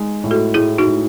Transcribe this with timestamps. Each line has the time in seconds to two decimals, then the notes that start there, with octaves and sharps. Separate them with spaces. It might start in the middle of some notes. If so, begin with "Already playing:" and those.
Already playing: G#3 D#4
0.24 A2
0.31 F#4 A4
0.54 A2 E4 G#4
0.78 D#4 F#4
0.86 A2